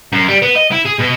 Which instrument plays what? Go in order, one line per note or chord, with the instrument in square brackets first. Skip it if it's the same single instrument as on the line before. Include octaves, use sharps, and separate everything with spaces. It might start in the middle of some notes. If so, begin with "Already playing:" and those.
[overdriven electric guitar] F#2
G3
B3
D#5
E4
G#4
B2